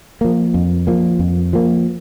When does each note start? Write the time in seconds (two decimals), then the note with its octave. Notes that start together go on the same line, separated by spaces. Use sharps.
0.21 F3 A#3
0.54 F2
0.87 F3 A#3
1.19 F2
1.53 F3 A#3